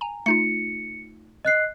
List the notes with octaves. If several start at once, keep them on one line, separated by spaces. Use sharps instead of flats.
G#5 A#5
A3 D#4 F4 C#7
D#5 F#6 C7